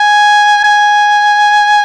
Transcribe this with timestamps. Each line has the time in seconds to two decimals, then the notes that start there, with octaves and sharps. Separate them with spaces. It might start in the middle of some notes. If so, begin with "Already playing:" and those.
Already playing: G#5
0.64 G#5